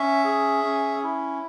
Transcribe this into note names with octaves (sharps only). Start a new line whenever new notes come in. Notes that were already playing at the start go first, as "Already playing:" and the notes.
Already playing: C#4 E5
G#4
C#4
E4